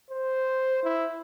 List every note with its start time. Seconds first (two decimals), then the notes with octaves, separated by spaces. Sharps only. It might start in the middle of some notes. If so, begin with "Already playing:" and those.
0.10 C5
0.84 E4